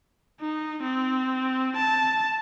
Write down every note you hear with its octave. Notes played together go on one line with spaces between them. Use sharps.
D#4
C4
A5